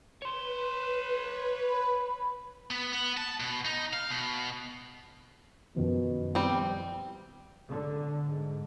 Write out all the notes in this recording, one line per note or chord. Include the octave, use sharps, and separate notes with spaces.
B4 C#5 C6
B5
B3
B3
A5
B2
D#4
F5
B2
F#2 B2 D#3 F3
G3 C4
D3
G#2